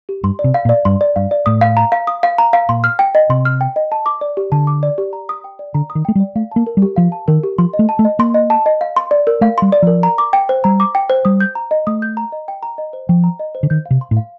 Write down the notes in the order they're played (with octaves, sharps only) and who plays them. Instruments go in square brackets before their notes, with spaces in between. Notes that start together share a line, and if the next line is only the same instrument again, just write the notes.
[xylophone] G4
[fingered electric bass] G2 [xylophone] C6
[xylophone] D5
[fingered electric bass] C3
[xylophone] F5
[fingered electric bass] A#2
[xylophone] D5
[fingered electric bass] G2 [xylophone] C6
[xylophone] D5
[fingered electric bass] G2 [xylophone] F5
[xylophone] D5
[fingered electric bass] A2 [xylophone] D#6
[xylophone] F5
A#5
F5
D#6
F5
A#5
F5
[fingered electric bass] A#2 [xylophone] C6
[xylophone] F6
G5
D#5
[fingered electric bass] C3 [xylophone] C6
[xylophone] F6
G5
D#5
A5
D6
D5
G4
[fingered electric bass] D3 [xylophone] A5
[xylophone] D6
D5
G4
A#5
D#6
G5
D5
[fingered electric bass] D3 [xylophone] A#5
[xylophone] D#6
[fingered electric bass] D#3
[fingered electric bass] A3 [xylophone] G5
[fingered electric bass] G3
[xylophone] D5
[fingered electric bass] A3 [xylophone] F5
[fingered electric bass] A#3 [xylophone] A5
[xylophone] A#4
[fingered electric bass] G3
[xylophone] G4
[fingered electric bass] F3 [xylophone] F5
[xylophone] A5
[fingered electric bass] D#3 [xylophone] A#4
[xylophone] G4
[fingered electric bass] F3 [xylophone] C6
[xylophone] D#5
[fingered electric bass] A3
[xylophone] A5
[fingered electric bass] A3
[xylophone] D#5
[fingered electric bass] A#3 [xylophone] C6
[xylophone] D#5
A5
D#5
F5
C6
D5
A#4
[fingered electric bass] A3 [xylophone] F5
[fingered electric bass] G3 [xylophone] C6
[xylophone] D5
[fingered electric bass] F3 [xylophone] A#4
[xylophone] A#5
D6
G5
C5
[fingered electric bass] G3 [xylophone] A#5
[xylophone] D6
G5
C5
[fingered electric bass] G3 [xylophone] D#6
[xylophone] G6
A#5
D#5
[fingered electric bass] A3 [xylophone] D#6
[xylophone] G6
A#5
D#5
G5
A#5
D#5
C5
[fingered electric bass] F3 [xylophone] G5
[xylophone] A#5
D#5
C5
[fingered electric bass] D3
[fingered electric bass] D#3 [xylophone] G6
[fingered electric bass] C3 [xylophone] F5
[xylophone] C6
[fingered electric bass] A2
[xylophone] F5